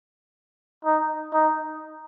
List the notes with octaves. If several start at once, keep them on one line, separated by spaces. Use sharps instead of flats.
D#4
D#4